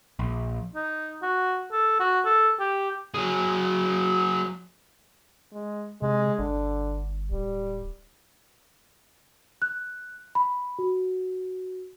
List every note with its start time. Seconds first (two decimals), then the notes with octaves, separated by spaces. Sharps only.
0.19 A#1
0.75 D#4
1.22 F#4
1.72 A4
2.00 F#4
2.25 A4
2.60 G4
3.14 F#3 G#4
5.53 G#3
6.02 C3 G#3
6.39 G1 D3
7.31 D1 G3
9.62 F#6
10.35 B5
10.79 F#4